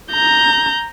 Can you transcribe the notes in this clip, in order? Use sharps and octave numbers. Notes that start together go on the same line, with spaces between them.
A#5 G6